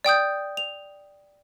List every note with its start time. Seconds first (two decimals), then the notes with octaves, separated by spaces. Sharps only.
0.04 D5 G5 D#6 G6
0.57 F7